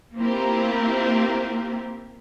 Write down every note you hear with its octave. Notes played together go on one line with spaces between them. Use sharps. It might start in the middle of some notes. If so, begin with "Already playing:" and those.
A#3 C4 E4 F4 G4 A#4